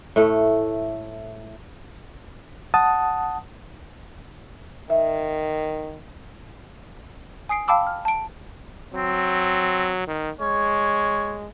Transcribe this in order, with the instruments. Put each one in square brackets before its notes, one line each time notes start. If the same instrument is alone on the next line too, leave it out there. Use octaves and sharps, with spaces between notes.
[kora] A2 A3
[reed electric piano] F#5 A5 D#6
[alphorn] D#3 [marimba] E5
[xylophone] G#5 D#6 C7 D7
F5 G5 A5 B5 D6 E6
F6
A5 D7
[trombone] F#3 [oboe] C4
[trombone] D#3
[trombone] G#3 [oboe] C#5